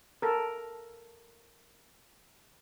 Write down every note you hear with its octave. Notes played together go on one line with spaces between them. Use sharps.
A4 A#4